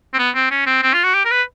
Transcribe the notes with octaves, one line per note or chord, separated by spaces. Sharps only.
C4
B3
C4
C#4
C4
C4
F4
F#4
G4
A#4
B4